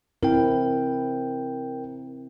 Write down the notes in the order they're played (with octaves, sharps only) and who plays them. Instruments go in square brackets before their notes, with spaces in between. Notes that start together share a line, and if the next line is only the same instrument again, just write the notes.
[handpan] C4 E4 [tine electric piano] A#4 G5